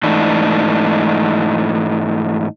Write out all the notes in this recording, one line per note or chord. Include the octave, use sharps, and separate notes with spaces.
G#2 E3 A3 D4 D#4